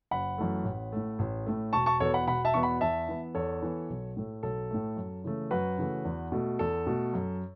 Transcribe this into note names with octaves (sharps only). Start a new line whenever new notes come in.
F#1 F#5 B5
F#2 E3 A3
A1
A2 A3
A1
A2 A3
E1 A5 C#6
A5 C#6
E2 B2 B3 A4 C#5
F#5 B5
E1 F#5 B5
E5 A5
E2 B2 B3 C#6
F#5 B5
E2 E5 A5
E3 B3
E2 A4 C#5
E3 B3
B1
A2 A3
B1 A4
A2 A3
F#2
C#3 E3 A3
F#2 F#4 B4
C#3 E3 A3
E2
B2 A3
E2 A4
B2 A3
F#2